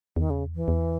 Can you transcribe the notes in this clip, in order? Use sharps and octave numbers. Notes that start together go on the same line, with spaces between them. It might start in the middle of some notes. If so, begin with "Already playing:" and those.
E2 D#3
C#3
E3
E2